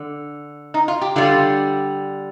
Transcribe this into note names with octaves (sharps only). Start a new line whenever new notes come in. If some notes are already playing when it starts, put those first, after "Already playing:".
Already playing: D3
D#4
F4
G4
D3 G3 F4